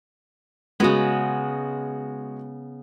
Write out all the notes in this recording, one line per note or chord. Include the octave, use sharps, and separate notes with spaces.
C#3 G#3 B3 F#4